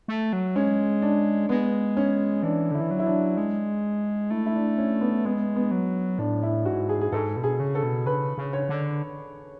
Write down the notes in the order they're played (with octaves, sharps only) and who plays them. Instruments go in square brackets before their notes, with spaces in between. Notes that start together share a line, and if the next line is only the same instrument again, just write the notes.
[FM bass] A3
F#3
[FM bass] G#3 [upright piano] C#4
[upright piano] D4
[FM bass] G#3 [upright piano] B3
[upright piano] C#4
[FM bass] E3 [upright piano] D4
[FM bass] D3 [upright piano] E4
[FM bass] E3
F#3
[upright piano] E4
D4
[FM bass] G#3
[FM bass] A3 [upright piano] E4
[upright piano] E4
D4
C#4
B3
[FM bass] G#3 [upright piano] B3
[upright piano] B3
[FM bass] F#3
[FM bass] A2 [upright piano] D4
[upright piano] E4
[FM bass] G#2 [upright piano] F#4
[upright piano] G#4
G#4
[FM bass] G#2 [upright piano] A4
[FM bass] B2
[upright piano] G#4
[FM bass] C#3
[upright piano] A4
[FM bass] B2
[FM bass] C#3 [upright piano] B4
[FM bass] C#3
[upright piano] C#5
[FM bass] D3